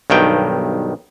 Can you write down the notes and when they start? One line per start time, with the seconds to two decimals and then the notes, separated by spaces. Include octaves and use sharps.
0.10 B1 G2 D#3 G5